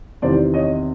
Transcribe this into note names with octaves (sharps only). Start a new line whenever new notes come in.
E2 C3 D#3 C5 D5
C#5 D#5